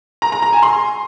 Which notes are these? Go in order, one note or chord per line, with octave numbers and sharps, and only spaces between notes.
A#5
A#5
A#5
G#5
C6